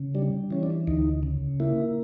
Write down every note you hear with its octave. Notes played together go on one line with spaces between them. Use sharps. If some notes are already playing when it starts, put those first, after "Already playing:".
Already playing: C#3
G3 D4
E3 C#4
D4
D2 D#4
C#3
A#3 E4